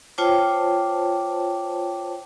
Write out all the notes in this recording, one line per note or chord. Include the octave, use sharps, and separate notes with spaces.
F4 C5 C#5 G5 A5 D6